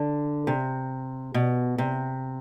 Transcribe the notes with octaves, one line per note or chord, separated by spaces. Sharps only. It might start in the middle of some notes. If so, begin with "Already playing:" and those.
Already playing: D3
C3
B2
C3